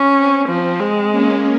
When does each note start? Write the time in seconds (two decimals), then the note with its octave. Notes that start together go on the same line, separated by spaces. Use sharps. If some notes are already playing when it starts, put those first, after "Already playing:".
Already playing: C#4
0.17 C4
0.48 F3 C4
0.80 G#3
1.11 A#3 C#4